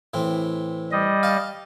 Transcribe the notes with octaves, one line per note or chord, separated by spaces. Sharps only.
A2 E3 C4
G3 D#5
F5 A5